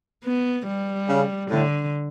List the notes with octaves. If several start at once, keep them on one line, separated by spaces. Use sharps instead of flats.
B3
G3
C#3
A2 D3